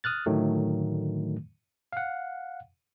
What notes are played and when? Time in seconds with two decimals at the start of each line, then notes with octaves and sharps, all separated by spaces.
0.04 D#6 F6 F#6 A6
0.26 A2 D3 D#3 F#3 A3
1.93 F5 F#5